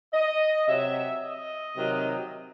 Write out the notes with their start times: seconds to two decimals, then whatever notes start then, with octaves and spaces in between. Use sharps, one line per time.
0.13 D#5
0.67 C3 F#3 E5
1.21 D#5
1.76 C3 D#3 F#3